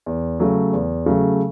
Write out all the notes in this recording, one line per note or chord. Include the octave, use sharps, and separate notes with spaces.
E2
C#3 F#3 A3
E2
C#3 F#3 A3